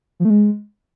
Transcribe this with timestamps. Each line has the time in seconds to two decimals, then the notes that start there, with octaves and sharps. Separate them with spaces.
0.20 F3
0.25 A3
0.30 G#3